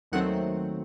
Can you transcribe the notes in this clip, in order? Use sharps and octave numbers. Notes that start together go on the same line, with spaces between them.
D#2 D#3 F#3 A3 C4 F#5